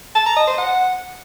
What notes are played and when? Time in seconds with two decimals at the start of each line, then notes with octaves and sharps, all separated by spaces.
0.15 A5
0.26 A#5
0.37 D#5
0.47 C5
0.58 F#5